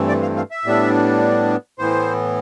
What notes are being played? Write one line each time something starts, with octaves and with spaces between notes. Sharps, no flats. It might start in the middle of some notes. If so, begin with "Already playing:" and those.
Already playing: G2 E3 A3 C4
D5
F5
F5
E5
A2 G3 B3 D4
A2 E3 B3 C5